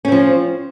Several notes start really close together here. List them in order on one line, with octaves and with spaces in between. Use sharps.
C#4 C4 F3